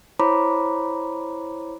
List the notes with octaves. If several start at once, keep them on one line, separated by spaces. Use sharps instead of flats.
E4 C5 C#5 A#5 B5 D6